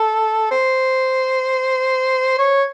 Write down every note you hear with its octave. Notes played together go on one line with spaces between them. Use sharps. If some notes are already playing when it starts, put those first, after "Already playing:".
Already playing: A4
C5
C#5